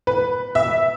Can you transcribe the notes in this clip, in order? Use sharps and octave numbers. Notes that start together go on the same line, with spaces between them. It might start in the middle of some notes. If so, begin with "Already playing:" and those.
B4
E5